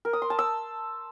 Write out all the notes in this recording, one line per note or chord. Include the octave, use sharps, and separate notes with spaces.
A#4
D#6
C6
A5
E6